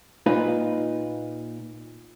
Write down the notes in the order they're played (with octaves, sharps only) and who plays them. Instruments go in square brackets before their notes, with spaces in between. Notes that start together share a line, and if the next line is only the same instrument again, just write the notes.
[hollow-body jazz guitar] A#2 D#4 F4 B4